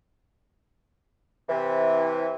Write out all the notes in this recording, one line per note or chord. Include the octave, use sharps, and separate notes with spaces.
C3 E3